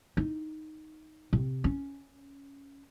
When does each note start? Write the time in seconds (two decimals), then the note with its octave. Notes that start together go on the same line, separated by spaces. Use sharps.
0.17 D#4
1.33 C3
1.64 C#4